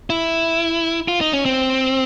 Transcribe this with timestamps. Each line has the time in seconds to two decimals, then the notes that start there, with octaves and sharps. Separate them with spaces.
0.10 E4
1.08 F4
1.21 D#4
1.33 C#4
1.45 C4